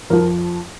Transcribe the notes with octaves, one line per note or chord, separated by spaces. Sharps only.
F2 F3 A#4